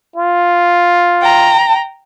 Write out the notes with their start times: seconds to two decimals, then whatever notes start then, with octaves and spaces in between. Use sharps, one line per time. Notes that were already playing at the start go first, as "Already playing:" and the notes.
0.16 F4
1.22 G5 A#5